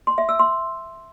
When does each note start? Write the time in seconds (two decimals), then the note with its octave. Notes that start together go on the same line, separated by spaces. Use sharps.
0.07 C6
0.18 E5
0.29 E6
0.39 C6